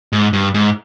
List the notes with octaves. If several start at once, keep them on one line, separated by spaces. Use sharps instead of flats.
G#2
G2
G#2